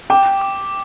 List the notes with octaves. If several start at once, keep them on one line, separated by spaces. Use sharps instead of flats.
G5 D6
D6